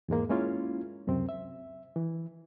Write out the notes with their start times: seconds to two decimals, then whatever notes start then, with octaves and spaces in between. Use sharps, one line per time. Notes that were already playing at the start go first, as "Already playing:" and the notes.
0.08 E2 G#2 G#3 A#3
0.30 G#3 A#3 C#4 E4 F4
1.07 C#2 F#2 C3 C4
1.29 E5
1.96 E3